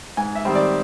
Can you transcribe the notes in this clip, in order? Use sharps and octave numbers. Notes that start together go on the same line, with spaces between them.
G#2 G#5
E5
D#3 G3 C4
D5